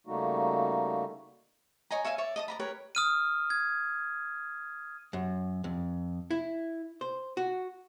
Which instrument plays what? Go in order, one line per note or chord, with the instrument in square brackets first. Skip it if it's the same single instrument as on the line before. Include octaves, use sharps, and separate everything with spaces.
[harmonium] C#3 G3 A3 A#3 D#4 F#4
[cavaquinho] C#5 D#5 G#5 A#5
C#5 E5 F5 G#5
C#5 D5 E5
D#5 A5 D#6
D5 A#5 B5
G4 A#4 B4 C#5
[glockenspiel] D#6 F6 D#7
G#6
[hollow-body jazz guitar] F#2
F2
E4
C5
F#4